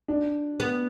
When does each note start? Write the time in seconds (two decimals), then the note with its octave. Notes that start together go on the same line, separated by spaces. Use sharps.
0.08 D4
0.60 B3